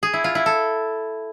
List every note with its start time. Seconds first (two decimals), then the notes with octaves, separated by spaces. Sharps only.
0.03 G#4
0.13 E4
0.24 F4
0.35 E4
0.46 A4